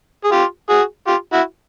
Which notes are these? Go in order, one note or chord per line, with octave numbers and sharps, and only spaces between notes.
G#4
F4 G4
F#4 G#4
F4 G4
E4 F#4